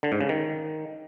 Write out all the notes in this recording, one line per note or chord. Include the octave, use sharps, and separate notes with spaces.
D3
G#2
C#3
D#3